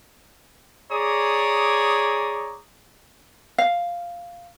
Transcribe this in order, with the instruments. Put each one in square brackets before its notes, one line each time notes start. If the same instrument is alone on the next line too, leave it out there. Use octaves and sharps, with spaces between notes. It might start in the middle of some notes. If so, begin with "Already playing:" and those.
[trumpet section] G#4 C#5 D5 A#5 D6 D#6
[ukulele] F5